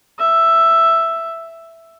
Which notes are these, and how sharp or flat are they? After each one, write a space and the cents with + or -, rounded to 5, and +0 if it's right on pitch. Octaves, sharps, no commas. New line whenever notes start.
E5 +5